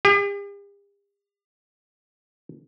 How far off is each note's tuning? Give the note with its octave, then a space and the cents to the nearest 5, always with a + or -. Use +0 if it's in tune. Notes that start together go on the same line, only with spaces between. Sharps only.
G4 +45